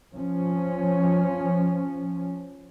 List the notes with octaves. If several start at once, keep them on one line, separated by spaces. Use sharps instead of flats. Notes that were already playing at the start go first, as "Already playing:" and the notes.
F3 C#4